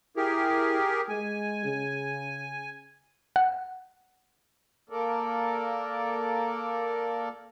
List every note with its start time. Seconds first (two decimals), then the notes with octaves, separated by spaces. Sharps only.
0.17 E4 G4 G#4 A#4
1.09 G#3 G#5
1.65 C#3
3.36 F#5
4.90 A#3 A4 A#4 D5